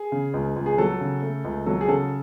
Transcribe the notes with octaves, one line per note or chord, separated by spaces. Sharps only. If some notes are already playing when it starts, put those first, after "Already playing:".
Already playing: G#4
C#3
C#2
C#2
G#4
F#3 A4
C#3
A3
C#2
F#3 A4
G#4
C#3 A4